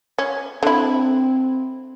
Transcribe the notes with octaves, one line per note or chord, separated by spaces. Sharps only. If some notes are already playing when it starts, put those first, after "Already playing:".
C#4
D3 C4 E4